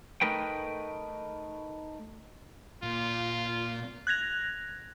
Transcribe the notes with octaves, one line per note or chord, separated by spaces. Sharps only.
A3 D#4 A#4 B4 G5
A#2 F4
F#6 G#6 A#6 F7